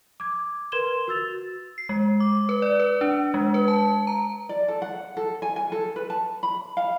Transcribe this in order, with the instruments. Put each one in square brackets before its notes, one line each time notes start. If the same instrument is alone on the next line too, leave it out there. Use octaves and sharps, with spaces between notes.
[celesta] D6 G#6
A#4 B4 C6 G#6 E7 G7
F#4 E6 A6 F7
[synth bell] C7
G#3
D6
B4
D5
B4
D4
G#3
B4
A5
A#5
[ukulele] D5
A4
F#5
A4
G#5
G#5
A4
B4
A5
B5
F5